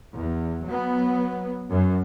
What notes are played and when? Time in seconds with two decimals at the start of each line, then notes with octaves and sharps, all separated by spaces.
0.17 E2
0.65 F#3 B3
1.70 F#2